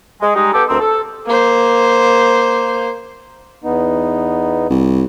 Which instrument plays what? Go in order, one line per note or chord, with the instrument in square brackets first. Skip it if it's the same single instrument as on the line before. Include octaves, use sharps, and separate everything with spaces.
[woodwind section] G#3
G3 G#3 D#4
B3 G4 A4
D2 C4 A#4 E6
A4
[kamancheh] A#3 C5
[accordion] E2 B3 D#4
[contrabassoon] C2